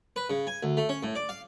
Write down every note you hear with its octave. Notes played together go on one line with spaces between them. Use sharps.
B4
C#3
G#5
D2
A3
C#4
A2
D5
F5